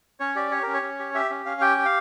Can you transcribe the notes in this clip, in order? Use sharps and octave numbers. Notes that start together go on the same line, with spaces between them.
C#4 C#5
G4 D5
G4 C#5
C#4 A#4
C#5
C#4
G4
G4 E5
C#4
C#4 F5
G4 G5
G4
F5